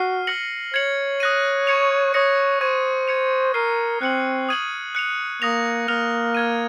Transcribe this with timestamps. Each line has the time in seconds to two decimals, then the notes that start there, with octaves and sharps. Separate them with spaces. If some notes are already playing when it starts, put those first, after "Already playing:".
Already playing: F#4 F6 C7 D#7
0.27 F6 A#6 C#7 F#7
0.74 C#5 G#6 C#7 F#7
1.20 D#6 F#6 A#6 D#7
1.67 C#6 G#6 C#7 F7
2.14 C#5 D#6 A#6 C#7
2.61 C5 C#6 G#6 D#7
3.08 G#6 C#7 F7
3.54 A#4 F6 C7 D#7
4.01 C4 F#6 C#7 F#7
4.49 D#6 G#6 D#7 F#7
4.95 F#6 C#7 F7
5.42 A#3 D#6 A#6 F7
5.88 A#3 F6 A#6 F7
6.35 F6 G#6 D#7